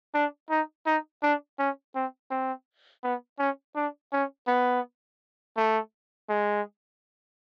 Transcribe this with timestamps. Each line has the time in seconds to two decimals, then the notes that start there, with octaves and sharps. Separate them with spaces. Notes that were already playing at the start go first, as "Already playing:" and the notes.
0.14 D4
0.50 D#4
0.87 D#4
1.23 D4
1.59 C#4
1.95 C4
2.31 C4
3.04 B3
3.39 C#4
3.76 D4
4.13 C#4
4.48 B3
5.57 A3
6.29 G#3